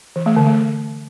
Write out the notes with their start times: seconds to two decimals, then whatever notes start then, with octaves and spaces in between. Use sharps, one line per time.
0.16 E3
0.26 A3
0.36 D3
0.47 A3